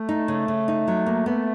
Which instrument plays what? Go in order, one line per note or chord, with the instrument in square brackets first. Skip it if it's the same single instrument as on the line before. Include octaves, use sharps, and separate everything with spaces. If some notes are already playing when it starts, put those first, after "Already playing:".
Already playing: [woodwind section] A3
[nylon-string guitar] D#4
C#3
C#3
D#4
F#3
A#3
[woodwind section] A3 [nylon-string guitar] B3